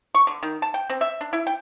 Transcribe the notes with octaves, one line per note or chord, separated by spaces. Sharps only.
C#6
D3
D#3
A5
G5
C4
E5
D4
E4
G5